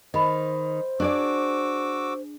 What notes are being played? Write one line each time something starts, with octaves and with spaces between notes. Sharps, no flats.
D#3 C5 D#5 B5
D4 F#4 G#4 D5 D6 E6